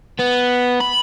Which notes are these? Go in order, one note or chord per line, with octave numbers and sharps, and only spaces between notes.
B3
B5